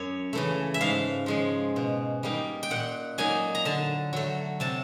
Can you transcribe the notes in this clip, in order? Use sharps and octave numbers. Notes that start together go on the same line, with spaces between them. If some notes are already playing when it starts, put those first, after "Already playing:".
Already playing: F#2 C#5
C#3 E3 A3
E5
G#2 F5
F3 G#3 C#4
B2
G3 A#3 D#4
G5
A#2 F#5
F#3 A#3 D#4 G#5
A#5
D3 A5
F#3 A3
C3 A5